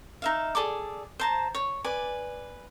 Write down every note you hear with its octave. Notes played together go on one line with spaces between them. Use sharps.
D#4 E5 F5
G#4 A4 D5 D6
C5 A5 A#5
C#5
B4 D5 G#5